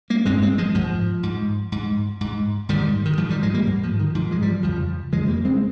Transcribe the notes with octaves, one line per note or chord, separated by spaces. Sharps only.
G3 A#3
G2 G#3 C4
G#3 C4
F3 G#3
G#2 F3
G#2
G#2
G#2
G#2 D#3 G3
D#3
G#2 F3
D#3 G3
F3 G#3
G3 A#3
G#2
F3
D#3
G#2 F3
F3 G#3
G3
F3
F2 C#3 F3
F2 C#3 F3 G#3
G3 A#3
G#3 C4